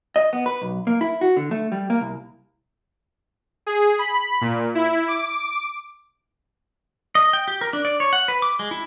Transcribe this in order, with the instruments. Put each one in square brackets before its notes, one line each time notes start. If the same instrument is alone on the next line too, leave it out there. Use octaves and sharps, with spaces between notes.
[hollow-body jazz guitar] D#5
B3
B4
B1
A#3
E4
F#4
D3
A3
G3
A#3
C2
[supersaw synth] G#4
B5
A#2
E4
D6
[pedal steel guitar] D#5
G5
G4
A#4
D4
D5
C#5
F#5
B4
D6
G#3
E4